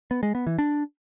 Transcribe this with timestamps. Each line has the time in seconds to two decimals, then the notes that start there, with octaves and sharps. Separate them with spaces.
0.11 B3
0.23 G#3
0.35 B3
0.47 E3
0.59 D4